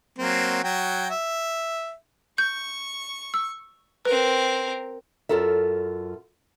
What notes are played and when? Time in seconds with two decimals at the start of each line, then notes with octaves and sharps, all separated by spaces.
0.18 F#3 A#3 C4
0.64 F#3 F#4 G5
1.10 E5
2.38 C#6 G6
3.34 E6
4.05 C4 A#4 B4
5.29 F#2 F4 A4 A#4 E5